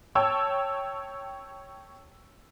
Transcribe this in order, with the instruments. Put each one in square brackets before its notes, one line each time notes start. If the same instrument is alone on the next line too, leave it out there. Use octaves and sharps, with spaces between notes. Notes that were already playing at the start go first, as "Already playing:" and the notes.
[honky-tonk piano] C#5 G5 A5 E6